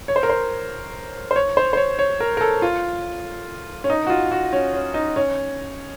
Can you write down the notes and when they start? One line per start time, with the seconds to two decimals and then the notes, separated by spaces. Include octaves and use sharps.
0.08 C#5
0.16 C5
0.23 A#4
0.30 C5
1.31 C5
1.36 C#5
1.57 C5
1.73 C5
1.77 C#5
1.99 C#5
2.20 A#4
2.37 A#4
2.41 A4
2.62 F4
3.84 C#4
3.90 D#4
4.07 F#4
4.10 F4
4.31 F#4
4.53 C#4
4.74 C#4
4.94 D#4
5.16 C#4